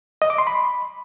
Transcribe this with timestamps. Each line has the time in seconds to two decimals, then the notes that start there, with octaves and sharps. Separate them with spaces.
0.22 D#5
0.30 D6
0.38 C6
0.47 B5